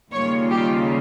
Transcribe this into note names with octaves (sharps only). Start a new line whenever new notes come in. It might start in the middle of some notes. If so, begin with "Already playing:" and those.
D#2 C#3 G3 A#3 F4 C#5
G4